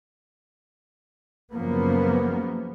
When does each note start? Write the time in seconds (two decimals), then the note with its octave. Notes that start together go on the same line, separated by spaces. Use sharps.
1.52 F#2 C#3 F3 A#3 B3